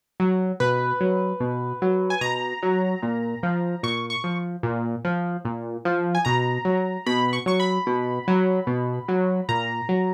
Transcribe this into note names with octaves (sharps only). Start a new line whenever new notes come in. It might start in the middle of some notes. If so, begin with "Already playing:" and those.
F#3
B2 B4
F#3
B2
F#3
G#5
B2 A#5
F#3
A#2
F3
A#2 C#6
C#6
F3
A#2
F3
A#2
F3
G#5
B2 A#5
F#3
B2 B5
C#6
F#3 C#6
B5
B2
F#3
B2
F#3
A#2 A#5
F#3